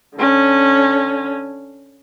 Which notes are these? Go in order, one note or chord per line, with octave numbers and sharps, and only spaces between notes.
D3 C#4